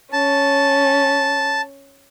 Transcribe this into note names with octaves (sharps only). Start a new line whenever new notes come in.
C#4 A5